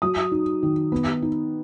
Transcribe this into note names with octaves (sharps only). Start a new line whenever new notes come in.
F#3 D#6
D#4
D#3
B3
D#4